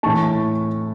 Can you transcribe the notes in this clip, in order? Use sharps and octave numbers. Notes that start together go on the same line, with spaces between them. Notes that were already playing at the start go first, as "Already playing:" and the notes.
A2 E3 A3 A5 C#6